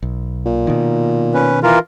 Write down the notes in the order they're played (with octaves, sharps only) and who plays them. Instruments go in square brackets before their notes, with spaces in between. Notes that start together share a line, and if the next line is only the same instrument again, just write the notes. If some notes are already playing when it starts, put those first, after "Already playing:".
[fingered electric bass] B1
[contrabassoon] A#2
[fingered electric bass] B2 D#3
[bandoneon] C#4 B4
E3 F4 A#4